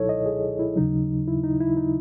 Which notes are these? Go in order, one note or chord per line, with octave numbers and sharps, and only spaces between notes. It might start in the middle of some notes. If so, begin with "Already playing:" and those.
Already playing: C#2 B2 F#3 D#4 E4 A4 C#5
D#5
G#4
E4
D#2 C#3 F#3 D#4
E4
D#4
E4
D#4